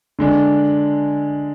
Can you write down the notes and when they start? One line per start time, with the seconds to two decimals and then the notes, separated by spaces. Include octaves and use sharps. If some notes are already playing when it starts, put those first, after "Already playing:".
0.19 D3 G#3 D4